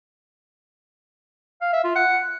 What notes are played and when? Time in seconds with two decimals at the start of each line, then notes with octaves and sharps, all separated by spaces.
1.61 F5
1.73 E5
1.84 F4
1.96 F#5